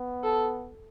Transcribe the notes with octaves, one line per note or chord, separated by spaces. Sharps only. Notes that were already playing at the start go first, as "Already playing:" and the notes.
Already playing: B3
A4